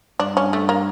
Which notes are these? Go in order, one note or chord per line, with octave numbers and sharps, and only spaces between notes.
G2 D4
C#4
A3
A#3